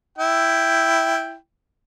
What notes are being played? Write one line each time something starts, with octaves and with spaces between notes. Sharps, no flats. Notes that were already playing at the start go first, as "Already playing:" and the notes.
E4 G5